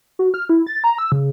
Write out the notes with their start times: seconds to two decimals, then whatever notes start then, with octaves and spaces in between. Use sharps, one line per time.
0.19 F#4
0.34 F6
0.49 E4
0.67 A6
0.84 A#5
0.98 E6
1.12 C#3